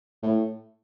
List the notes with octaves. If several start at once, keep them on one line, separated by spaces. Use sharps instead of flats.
A2